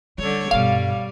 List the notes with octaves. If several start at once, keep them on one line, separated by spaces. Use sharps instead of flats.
D3 G3 A4 C#5
G2 B2 G3 F5